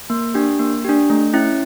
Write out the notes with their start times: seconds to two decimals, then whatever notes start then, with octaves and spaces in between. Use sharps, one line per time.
0.10 A#3
0.35 D4 G4
0.59 A#3
0.85 D4 G4
1.10 A3
1.33 C#4 E4